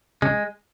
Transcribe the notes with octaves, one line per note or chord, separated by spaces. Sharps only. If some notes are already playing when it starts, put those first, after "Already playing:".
C#3 G#3